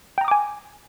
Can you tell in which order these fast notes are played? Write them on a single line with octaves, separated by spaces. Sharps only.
G5 A#5 D#6 D6 G#5